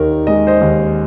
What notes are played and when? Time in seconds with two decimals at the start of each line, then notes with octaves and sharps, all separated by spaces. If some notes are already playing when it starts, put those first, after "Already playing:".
Already playing: D#2 D#3 A#4
0.27 G#3 D#5
0.47 C5 D#5
0.61 D#2